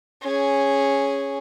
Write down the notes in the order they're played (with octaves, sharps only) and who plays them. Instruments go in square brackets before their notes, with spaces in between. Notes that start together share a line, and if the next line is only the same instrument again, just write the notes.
[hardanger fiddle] C#4 G#4